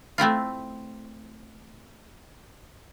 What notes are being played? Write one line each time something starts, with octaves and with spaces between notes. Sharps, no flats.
A3 C4 E4 F4